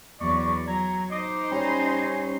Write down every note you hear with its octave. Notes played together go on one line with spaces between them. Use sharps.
E2 F#3 D5 C#6
F#3 A#5 G#6
D#4 C5 D#5 D6
G3 C#4 G#5